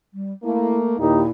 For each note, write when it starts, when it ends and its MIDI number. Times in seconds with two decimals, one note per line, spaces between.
0.13 0.32 55
0.43 0.95 57
0.43 0.95 58
0.43 0.78 64
0.99 1.20 39
0.99 1.30 46
0.99 1.20 63
0.99 1.31 64
0.99 1.20 67